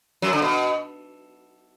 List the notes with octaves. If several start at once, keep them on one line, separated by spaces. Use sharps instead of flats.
F#2 F#3
D3
B2